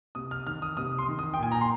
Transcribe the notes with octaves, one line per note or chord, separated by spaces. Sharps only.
C3 D#6
F6
D#3 F6
D#6
C3 D#6
C6
D#3
D#6
G5
A#2 G#5
A#5
C6